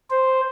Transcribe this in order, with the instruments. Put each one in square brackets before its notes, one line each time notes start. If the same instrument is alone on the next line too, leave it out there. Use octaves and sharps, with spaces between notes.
[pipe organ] C5